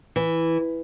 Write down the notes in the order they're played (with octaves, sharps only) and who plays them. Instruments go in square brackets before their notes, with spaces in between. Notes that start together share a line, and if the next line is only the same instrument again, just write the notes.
[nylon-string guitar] E3